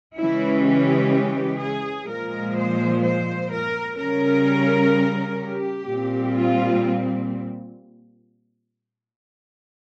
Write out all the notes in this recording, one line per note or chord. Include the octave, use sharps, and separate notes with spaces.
C#3 E3 G#3 C#4 E4
G4
G#4
A#2 F3 G#3 A#4
C5
C5
A#4
C#3 G3 C#4 A#4
G4
A#2 G3 C4
F4